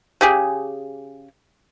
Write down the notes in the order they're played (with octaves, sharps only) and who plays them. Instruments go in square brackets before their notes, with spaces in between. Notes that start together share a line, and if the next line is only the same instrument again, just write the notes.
[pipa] C#3 G4 G#4